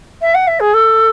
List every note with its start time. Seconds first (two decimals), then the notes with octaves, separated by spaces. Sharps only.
0.22 E5
0.35 F#5
0.47 E5
0.60 G#4
0.74 A4